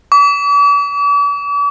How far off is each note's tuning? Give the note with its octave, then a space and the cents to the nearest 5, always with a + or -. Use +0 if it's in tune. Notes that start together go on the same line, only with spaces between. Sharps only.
D6 -45